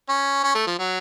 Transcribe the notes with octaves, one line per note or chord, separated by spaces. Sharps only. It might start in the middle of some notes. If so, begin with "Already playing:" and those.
C#4
C#4
A3
F3
F#3